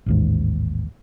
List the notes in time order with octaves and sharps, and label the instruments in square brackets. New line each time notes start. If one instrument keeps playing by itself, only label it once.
[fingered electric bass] A1 D#2 G#2